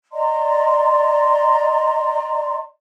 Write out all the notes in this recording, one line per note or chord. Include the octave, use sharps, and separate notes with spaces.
D5 D#5 A#5 C6